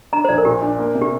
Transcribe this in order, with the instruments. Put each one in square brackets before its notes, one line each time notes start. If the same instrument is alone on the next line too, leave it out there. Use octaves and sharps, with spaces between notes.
[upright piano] D4 [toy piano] A#5
[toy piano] C5
[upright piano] A#1 [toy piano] D5
[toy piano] A#4
[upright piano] A#2 [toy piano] G4
[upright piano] D4
A#3
C3
[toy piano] G4